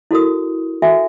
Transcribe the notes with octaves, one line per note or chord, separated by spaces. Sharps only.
E4 F#4 A4 A#4 D#6
F#4 A4 E5 G#5